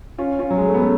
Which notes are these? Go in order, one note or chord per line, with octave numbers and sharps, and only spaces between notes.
C#4 F4
C#4 F4
F#3
G#3
A3
B3
A3 C#4